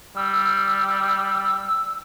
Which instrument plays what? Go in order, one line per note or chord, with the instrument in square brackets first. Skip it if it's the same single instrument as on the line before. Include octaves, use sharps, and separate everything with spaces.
[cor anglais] G3 [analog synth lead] E6